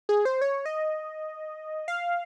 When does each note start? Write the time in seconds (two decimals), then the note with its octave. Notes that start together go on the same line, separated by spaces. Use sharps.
0.09 G#4
0.25 C5
0.41 C#5
0.66 D#5
1.88 F5